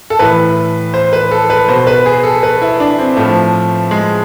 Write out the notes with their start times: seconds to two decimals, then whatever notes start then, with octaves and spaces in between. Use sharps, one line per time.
0.10 A4
0.19 A2 E3 B4
0.94 C5
1.13 B4
1.31 A4
1.50 B4
1.68 B2 C5
1.87 B4
2.06 G#4
2.24 A4
2.43 B4
2.61 E4
2.80 D4
2.98 C4
3.17 A2 F3 A3
3.91 G#3